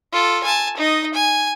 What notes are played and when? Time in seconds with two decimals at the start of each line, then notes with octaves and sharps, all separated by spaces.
0.12 F4 A4
0.44 G#5 A5
0.77 D#4 D#5
1.14 G#5